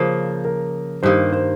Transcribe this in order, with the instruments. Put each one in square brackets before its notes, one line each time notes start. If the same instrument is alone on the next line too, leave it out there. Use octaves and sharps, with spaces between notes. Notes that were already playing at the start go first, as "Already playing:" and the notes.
Already playing: [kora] C#3 F3 A#3 [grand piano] C5
[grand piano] A#4
[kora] G2 D#3 A#3 [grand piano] C5
[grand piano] C5